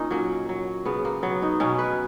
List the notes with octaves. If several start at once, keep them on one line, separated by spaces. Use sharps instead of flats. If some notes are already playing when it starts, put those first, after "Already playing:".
Already playing: A#2 C#4 D#4
F#3 A#3
F#3
C#3 B3
A#3
F#3 B3
D#4
B2 C#4
B4